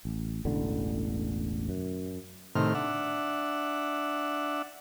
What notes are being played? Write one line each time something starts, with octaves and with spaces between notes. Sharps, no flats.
A1
E1 A1 D3
F#2
A2 C3 D#3 F6
D4 E5 F#5